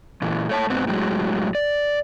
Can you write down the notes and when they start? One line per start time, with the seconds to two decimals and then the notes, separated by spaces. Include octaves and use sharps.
0.22 A#2 E3
0.49 A3 C#5 A5
0.70 G#2 B3 C4
0.87 A2 F#3 G#3
1.55 D5